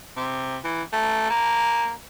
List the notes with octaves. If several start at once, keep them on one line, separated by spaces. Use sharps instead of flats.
C3
E3
A3
A#3